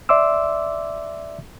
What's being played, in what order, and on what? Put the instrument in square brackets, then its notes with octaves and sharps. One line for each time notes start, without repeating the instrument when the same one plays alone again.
[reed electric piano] D5 E5 C6 D6 E6